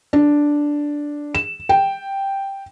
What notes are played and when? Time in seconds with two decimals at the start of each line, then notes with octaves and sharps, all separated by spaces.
0.13 D4
1.35 E7
1.69 G5